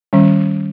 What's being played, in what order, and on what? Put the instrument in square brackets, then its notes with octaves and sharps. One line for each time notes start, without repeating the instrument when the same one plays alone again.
[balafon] D#3 G3 C#4